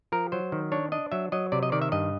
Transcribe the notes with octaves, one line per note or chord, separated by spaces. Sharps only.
F3 A#4
F#3 C5
D#3
D4 C#5
D4 D#5
F#3 E5
F#3 D#5
C3 D5
D#5
D#3 D5
E5
G2 D#5